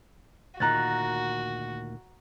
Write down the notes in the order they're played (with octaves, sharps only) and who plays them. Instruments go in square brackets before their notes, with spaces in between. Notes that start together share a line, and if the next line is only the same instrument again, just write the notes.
[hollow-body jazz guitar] D2 A#2 D#3 [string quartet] F#4 [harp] A#5 F#6 A6